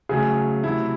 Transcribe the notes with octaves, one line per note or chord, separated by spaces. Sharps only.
C#3 F#3 A3 G#4
C3 F#3 A3 E4